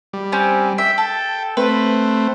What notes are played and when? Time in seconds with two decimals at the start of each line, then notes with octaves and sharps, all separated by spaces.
0.13 G3
0.32 C4 C#4
0.78 E5 G5
0.98 A4
1.57 A3 C4 B4